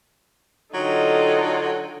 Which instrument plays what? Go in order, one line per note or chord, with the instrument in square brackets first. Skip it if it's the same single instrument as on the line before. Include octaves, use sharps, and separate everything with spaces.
[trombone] D3 [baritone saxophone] F#3 [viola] D#4 F4 [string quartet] A4 D#5 G5